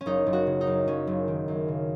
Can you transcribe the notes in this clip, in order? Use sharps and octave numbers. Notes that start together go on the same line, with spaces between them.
C#4
F#1 D#4
F#1
F#4
C#3
D#4
F#2
F#1 C#4
F#1
D#3
F#2
C#3